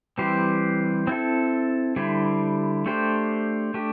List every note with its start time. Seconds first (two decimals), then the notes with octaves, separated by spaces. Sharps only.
0.18 E3 G3 C4 G4 C5
1.07 C4 E4 A4
1.96 D3 G3 E4 C5
2.86 A3 D4 G4 C5
3.74 A3 D4 G4